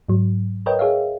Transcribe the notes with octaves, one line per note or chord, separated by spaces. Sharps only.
G#2 F#3
A#4 B4 C#5 D#5 G5
G#4 C#5 E5 F5